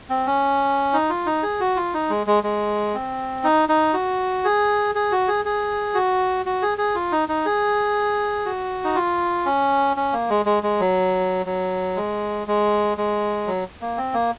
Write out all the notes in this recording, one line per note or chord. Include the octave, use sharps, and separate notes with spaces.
C4
C#4
D#4
F4
D#4
G#4
F#4
F4
D#4
G#3
G#3
G#3
C4
D#4
D#4
F#4
G#4
G#4
F#4
G#4
G#4
F#4
F#4
G#4
G#4
F4
D#4
D#4
G#4
F#4
D#4
F4
C#4
C#4
A#3
G#3
G#3
G#3
F#3
F#3
G#3
G#3
G#3
F#3
A#3
C4
A#3